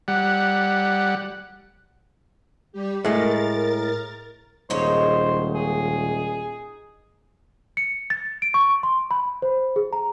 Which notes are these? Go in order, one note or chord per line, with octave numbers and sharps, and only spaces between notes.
G3 F#5
G3 G4
A2 G#3 A#4 A6
D#1 A#2 G#3 D#4 C5 C#5
G#4
C#7
A6
D7
C#6
C6
B5
C5
G#4
A#5